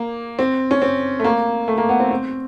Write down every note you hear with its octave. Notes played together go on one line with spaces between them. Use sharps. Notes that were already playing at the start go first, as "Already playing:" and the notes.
Already playing: A#3
C4
C#4
C4
A3
A#3
A3
A#3
B3
C4
C4